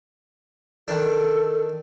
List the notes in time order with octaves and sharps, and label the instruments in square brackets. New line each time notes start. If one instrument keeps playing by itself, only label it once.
[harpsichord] D#3 D4 [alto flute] A4